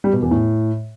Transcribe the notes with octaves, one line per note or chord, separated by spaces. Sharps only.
G3
B2
E2
A2